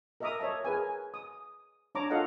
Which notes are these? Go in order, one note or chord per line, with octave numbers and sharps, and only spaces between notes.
A#4 D#5 E5 A#5 D6 D#6
A#4 C#5 D#5 E5 A5
G#4 A#4 B4 G#5
D#6
D4 C#5 A5 A#5 D6
F4 A4 D#5 F5 F#5